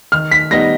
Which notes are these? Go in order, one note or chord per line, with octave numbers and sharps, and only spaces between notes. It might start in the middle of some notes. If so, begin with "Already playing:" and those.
D#3 F6
B6
G3 B3 D#4 A#6